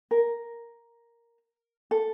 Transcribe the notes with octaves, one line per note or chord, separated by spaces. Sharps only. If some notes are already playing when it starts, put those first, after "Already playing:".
A#4
A4